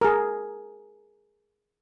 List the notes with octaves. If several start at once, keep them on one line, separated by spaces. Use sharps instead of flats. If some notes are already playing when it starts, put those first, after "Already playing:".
G#4 A#4